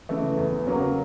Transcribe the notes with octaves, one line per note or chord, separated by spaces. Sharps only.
C#3 E3 A3
E2
C#3 F#3 A#3 C#4